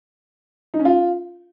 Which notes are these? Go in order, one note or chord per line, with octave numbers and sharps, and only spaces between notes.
D#4
C#4
F4